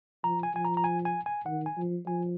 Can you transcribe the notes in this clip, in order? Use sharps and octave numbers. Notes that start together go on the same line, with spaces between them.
F3 A#5
G#5
F3 G#5
A#5
A#5
G#5
G#5
G#5
D#3 F#5
G#5
F3
F3 G#5